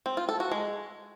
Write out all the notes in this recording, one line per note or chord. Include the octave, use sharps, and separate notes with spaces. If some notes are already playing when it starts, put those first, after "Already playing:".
C4
F4
A4
F#4
G#3